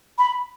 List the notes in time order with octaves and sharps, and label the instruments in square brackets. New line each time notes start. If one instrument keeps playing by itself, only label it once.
[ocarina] B5